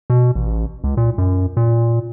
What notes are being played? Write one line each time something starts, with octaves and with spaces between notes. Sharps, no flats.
B2
A1
C#2
A#2
F#2
A#2